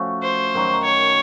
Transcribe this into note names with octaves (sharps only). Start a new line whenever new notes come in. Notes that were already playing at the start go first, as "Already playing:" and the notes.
Already playing: F3 A3 C#4 F#4
C5
F#2 D#3 F#3
C#5